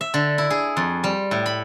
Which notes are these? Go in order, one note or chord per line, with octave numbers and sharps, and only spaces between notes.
E5
D3
E4
G#4
F2
G3
A2
B5